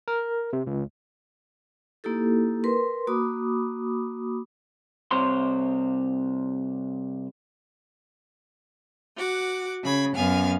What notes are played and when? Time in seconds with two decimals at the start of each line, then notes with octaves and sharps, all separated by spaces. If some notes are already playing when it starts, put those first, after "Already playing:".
0.08 A#4
0.53 C3
0.67 C#2
2.04 A#3 D#4 E4 G4 A4
2.64 A#4 B4 C6
3.07 A#3 F#4 B5 D6 D#6
5.11 C2 C3 C5 C#5 C6
9.15 F#4 F#5 D6
9.83 C#3 B5 G#6
10.15 F#2 B3 F5 G#5 F6